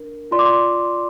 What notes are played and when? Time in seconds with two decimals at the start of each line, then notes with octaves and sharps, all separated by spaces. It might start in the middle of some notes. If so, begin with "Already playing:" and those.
Already playing: D4 A#4
0.31 F4 D5 C6
0.39 D6
0.45 C6